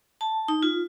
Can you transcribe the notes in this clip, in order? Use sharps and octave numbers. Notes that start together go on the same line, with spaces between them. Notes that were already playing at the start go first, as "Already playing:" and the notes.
A5
D#4
F4